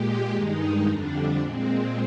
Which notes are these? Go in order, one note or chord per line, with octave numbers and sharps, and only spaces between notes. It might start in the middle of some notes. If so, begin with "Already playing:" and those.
Already playing: A#2 G#3 G4
G2 D#3 G#3 D#4
F2 D3 G3 D4
A#2 G#3 C4